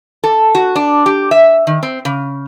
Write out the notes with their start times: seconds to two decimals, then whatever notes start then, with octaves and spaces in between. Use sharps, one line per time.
0.24 A4
0.55 F#4
0.76 D4
1.06 G4
1.31 E5
1.67 D#3
1.83 C4
2.05 C#3